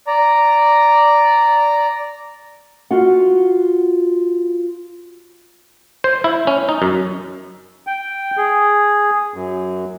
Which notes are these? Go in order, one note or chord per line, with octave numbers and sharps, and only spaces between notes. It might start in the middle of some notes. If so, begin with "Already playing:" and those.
D5 A#5
F4 F#4 F#5
C5
E4
C#4
D#4
F#2
G5
G#4
F#2